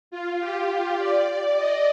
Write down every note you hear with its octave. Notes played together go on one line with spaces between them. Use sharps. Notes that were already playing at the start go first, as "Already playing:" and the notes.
F4
G4
D5
D#5